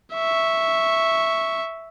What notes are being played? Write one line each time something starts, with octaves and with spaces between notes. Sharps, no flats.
E5 C#6